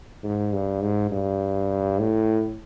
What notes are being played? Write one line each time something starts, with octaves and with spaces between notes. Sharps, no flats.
G#2
G2
G#2
G2
A2